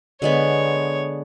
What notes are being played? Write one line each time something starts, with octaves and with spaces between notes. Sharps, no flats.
D3 G#3 B3 C#5